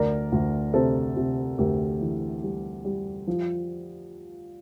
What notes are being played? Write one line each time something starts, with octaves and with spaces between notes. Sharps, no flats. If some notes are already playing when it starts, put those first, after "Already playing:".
Already playing: D2 A#4 D5
D2
C3 A4 C5
C3
D2 G4 A#4
E3
G3
G3
F3